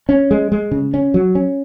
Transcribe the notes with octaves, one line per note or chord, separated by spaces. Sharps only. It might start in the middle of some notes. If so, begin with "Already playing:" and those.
C#4
G#3
G#3
C#3
C#4
F#3
C#4